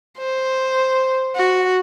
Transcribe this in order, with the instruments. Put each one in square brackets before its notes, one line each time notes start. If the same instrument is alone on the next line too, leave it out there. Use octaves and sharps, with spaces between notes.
[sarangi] C5
F#4